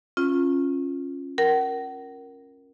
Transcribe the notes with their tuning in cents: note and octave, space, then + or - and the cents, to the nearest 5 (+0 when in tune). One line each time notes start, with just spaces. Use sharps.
C#4 -15 F4 +0
A#4 +0 F#5 +40